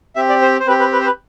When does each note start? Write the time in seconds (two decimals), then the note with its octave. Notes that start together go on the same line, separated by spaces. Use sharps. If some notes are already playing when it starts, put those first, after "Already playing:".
0.16 C4 G4 E5
0.29 D5
0.42 C5
0.60 C5
0.67 C4 G4 B4
0.80 B4
0.93 B4
1.01 C5
1.06 B4